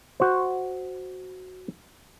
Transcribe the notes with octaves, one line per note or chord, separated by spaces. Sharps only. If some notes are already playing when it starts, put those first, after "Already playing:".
F#4 C5